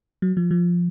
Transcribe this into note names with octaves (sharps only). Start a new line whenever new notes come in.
F#3
F3
F3